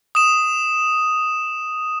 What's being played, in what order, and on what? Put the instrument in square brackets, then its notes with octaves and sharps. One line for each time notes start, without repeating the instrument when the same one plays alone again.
[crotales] D#6 E7